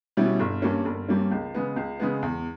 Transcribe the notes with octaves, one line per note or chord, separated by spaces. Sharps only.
B2 G3 C#4 E4
G1
G2 G3 A#3 C#4
G1
G2 G3 A#3 C#4
C#2
C#3 G#3 B3
C#2
C#3 G#3 B3
E2